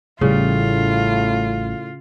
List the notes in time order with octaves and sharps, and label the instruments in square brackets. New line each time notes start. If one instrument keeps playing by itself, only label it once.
[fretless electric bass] A1 E3 G3 [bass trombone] A2 [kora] C#3 [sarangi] F4